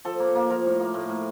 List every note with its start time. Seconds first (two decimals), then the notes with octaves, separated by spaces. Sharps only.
0.05 F3 A4
0.20 A#3
0.35 A#3
0.50 F3 A#4
0.65 A2
0.80 A#3
0.94 A2
1.09 A2